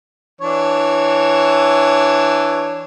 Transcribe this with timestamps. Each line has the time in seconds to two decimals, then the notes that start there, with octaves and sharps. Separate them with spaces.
0.41 E3 D4 C#5